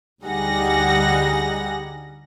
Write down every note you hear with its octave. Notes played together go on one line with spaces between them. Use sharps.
D2 G3 D#4 G#4 F#5 A#6